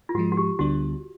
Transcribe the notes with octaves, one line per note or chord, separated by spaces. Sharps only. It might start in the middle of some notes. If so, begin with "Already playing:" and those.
F4
G#2 F3 G#3 F#4
F#4
G4
D2 D3 G3 B3 D4 F#4